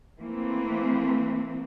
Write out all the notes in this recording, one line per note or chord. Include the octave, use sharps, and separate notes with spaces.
E3 A3 A#3 C4